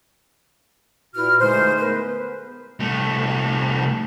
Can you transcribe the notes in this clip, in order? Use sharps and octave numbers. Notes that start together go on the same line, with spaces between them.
A#2 E4 F#4 B4 F6
D3 G#3 A3 D#4 G#4 C5
B3 A#4 B4
C2 A3